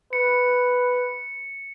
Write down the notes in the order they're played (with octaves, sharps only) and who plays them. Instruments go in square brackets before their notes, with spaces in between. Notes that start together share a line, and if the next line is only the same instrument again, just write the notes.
[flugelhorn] B4 [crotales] C#7